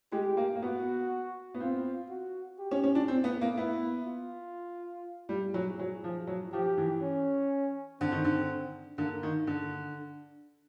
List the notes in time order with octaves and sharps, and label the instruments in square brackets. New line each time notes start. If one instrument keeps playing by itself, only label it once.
[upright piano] G#3 [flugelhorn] G4
[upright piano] A#3
A#3
[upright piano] B3 [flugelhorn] F#4
[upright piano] B3
[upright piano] C4 [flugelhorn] F4
[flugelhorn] F#4
G4
[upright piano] C#4
C#4
D4
C4
B3
A#3
[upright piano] B3 [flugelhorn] E4
[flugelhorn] F4
[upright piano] G3
[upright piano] F#3 [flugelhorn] G#4
[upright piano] F#3
F3
F#3
[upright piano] F3 [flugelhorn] G4
[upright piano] E3
[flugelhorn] C#4
[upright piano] D3 [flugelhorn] C4
[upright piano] D#3
D3
[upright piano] D3 [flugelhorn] A#3
[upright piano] D#3
D3